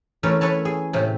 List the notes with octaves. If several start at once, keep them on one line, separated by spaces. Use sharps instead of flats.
E3 A3 C#4 A4 A#4
A4 B4 C#5 A5
G#4
A2 C3